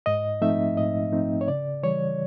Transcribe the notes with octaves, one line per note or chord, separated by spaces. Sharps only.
G#2 D#5
F3 A3 C4 D#4 E5
G#2 D#5
F3 A3 C4 D#4
C#5
C#3 D5
E3 G3 C#5